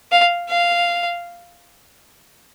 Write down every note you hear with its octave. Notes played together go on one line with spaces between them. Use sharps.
F5
F5